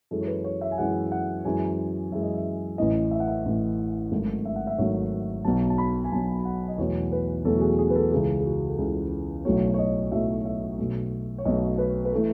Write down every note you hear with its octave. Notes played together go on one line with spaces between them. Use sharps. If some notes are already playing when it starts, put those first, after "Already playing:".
F#2 E3 G#3 A4
C#5
B4
C#5
E5
G#5
F#2 E3 G#3 F#5
F#5
F#2 E3 G#3 G#5
F#2 E3 G#3 E5
D#5
E5
A1 A2 E3 D#5
E5
F#5
E5
A1 A2 E3
G#1 G#2 F#3 A3
E5
F#5
E5
G#1 G#2 F#3 A3 C#5
B1 B2 F#3 A5
A5
B5
G#5
B1 B2 F#3 A5
F#5
D#5
E2 B2 F#3 A3 C#5
B4
E2 B2 F#3 A3 A4
F#4
G#4
G#4
B4
A4
C#2 C#3 E3 G#4
G#4
F#4
A4
C#2 C#3 E3 G#4
B1 A2 F#3 A3 C#5
C#5
D#5
B1 A2 F#3 A3 E5
E5
B1 B2 A3
C#5
B1 B2 A3 D#5
B4
B4
E3 A3 A4